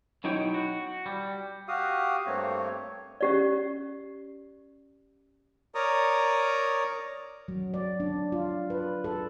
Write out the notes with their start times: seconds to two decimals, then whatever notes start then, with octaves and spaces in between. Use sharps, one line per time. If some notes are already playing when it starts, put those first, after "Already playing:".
0.24 B2 F#3 D#4 E4 C#5 G5
0.54 F#4
1.06 G3
1.68 F#4 G4 F5 D#6
2.27 G2 A3 A#3 C4 C#5
3.21 C#4 G4 D5
5.75 A#4 C#5 D5 A#5 D#6
7.48 F#3
7.74 D5
8.00 D4
8.32 F4
8.70 B4
9.04 A4